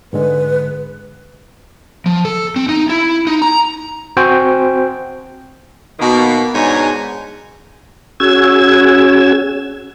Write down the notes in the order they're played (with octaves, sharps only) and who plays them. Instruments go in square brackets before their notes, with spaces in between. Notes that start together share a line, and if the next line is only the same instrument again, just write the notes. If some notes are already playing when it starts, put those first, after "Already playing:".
[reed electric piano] G#2 D3 G#3 [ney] B4
[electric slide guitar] F3
A4
C4
D#4
E4
D#4
A#5
[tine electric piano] C4 F#4 C5 G5 G#5
[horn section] B2 D#3 A#3
G#2 B2 D4 C#5 G#5 A#5
[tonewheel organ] C#4 F#4 G#4 E6 G#6